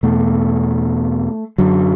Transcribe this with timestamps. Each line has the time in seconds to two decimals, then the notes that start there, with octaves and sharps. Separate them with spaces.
0.03 E2 B2 A3
1.58 F#2 D3 F#3